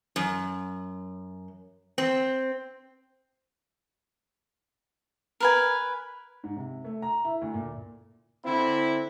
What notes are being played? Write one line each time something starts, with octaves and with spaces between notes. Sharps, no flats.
F#2
C4
A#4 B4 G#5
G#2
C3
A3
A#5
E4
D2
A#2
D3 C4 E4